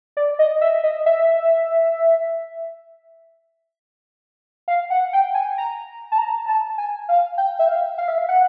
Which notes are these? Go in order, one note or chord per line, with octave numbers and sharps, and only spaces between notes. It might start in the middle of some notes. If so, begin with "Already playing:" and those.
D5
D#5
E5
D#5
E5
F5
F#5
G5
G#5
A#5
A5
A#5
A5
G#5
F5
G5
E5
F5
F5
E5
F5
F#5